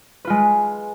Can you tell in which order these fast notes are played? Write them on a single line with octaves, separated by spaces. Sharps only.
B4 F4 G#3